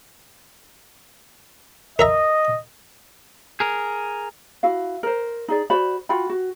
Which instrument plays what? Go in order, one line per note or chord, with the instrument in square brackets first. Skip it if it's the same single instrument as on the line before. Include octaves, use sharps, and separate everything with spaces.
[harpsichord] A#4 E5 A#5 [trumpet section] D#5
[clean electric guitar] G#4 A#4
[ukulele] E4 F#4 F5
A#4 C5
D#4 G#4 D5
F#4 C5 D5 B5
F4 F#4 G5 B5
F#4